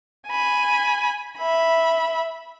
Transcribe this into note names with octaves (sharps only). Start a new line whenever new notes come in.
G#5 B5
E5 B5